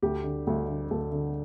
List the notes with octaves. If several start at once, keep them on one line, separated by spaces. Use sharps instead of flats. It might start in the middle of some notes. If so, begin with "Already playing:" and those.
D2 G4
D3
D2
D3
D2 A4
D3